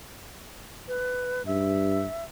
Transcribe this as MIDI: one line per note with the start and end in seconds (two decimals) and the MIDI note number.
0.88 1.43 71
1.46 2.06 43
1.46 2.24 76